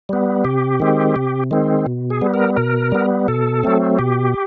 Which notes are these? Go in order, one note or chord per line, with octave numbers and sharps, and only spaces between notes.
G3 B3
C3 G4
D#3 G#3 C4
C3
D#3 G#3 C4
B2
G#4
G3 B3
A#4
B2 A#4
G3 B3
B2 A4
F#3 A3 C4
B2 G4